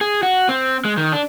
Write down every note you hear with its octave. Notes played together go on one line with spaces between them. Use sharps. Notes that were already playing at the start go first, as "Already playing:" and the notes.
G#4
F#4
C4
G#3
D#3
D4